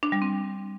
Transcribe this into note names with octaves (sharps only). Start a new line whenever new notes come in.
D4
G3
C4